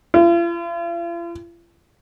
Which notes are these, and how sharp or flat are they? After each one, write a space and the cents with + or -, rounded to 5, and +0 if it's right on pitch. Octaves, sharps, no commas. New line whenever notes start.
F4 -45